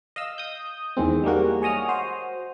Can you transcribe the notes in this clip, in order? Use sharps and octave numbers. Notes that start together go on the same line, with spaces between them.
D#5 F5 E6
D#6 G6
E2 D#3 G#3 C4
G3 G#3 A#3 F#4
G#4 C#5 D#5 D#6 F6
F#4 C5